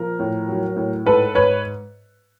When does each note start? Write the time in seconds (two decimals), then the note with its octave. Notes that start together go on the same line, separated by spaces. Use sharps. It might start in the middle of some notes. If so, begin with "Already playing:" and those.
Already playing: A#2 F3 A#4
0.19 A2
0.49 F#3
0.76 A2
1.06 G#2 A4 B4
1.35 G#2 B4 C#5